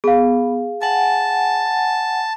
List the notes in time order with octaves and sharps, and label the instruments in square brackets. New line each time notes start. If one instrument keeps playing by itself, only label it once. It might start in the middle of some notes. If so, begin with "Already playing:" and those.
[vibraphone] B3 [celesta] G#4 F5
[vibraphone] F#5 G#5 [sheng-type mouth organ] A5